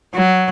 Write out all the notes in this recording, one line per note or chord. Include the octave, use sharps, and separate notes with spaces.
F#3